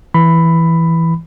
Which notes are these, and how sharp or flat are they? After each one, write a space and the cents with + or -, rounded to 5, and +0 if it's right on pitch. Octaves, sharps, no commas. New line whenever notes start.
E3 +0 B5 +10